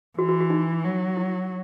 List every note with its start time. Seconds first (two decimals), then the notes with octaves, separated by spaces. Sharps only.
0.18 E3 F#4
0.29 F#4
0.40 F#4
0.50 D#4
0.84 F#3
1.17 E4